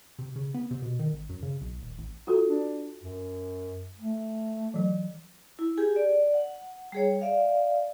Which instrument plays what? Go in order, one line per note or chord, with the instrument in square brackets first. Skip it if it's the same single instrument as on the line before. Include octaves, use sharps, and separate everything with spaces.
[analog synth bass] C3
C#3
B3
C3
B2
D#3
G#1
F#2
C#3
B1
D#1
A1
[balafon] F4 F#4 A4
[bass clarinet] D4
F#2
A3
[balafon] E3 F#3
[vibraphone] E4
G4 G#4 G#5
D5
F#5
G3 G#4 C#5
D5 E5 F5